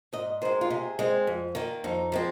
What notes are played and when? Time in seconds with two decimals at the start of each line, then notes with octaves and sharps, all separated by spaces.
0.13 G#2 D#5
0.42 D#3 G#3 C5
0.61 F4
0.70 C3 G#4
0.99 G#3 C4
1.27 F2
1.55 D#3 A#3
1.84 F2 D#4
2.12 F3 G#3 C4